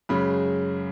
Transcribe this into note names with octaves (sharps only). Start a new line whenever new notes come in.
F#2 C#3 G#3 B5